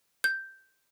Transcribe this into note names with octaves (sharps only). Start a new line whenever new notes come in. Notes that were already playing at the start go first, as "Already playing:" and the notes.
G6